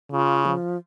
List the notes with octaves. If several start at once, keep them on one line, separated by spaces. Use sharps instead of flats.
C#3 F4
F3